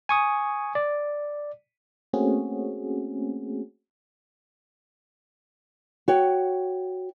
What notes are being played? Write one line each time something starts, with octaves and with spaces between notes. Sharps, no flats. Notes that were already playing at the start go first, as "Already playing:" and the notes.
G#5 C#6 D#6
D5
A3 A#3 C4 C#4 F#4 G#4
F#4 C#5 G5